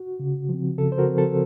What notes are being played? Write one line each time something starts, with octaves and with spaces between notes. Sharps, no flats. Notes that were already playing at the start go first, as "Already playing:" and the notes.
Already playing: F#4
C#3
F3
C4
C#3 A4
C5
F#4 A#4
F3 C4
A4